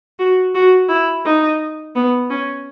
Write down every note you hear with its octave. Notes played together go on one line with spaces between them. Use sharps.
F#4
F#4
E4
D#4
B3
C#4